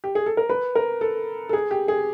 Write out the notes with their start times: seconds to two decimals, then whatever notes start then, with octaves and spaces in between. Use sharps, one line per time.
0.04 G4
0.15 G#4
0.26 A4
0.37 A#4
0.49 B4
0.75 A#4
1.01 A4
1.49 A4
1.53 G#4
1.71 G4
1.88 G#4